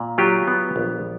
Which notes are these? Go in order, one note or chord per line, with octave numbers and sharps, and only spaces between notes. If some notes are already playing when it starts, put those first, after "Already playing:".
Already playing: A#2
F#3 F4 G4
B3
A#1